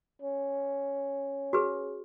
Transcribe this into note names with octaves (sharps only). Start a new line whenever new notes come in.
C#4
F#4 G#4 B4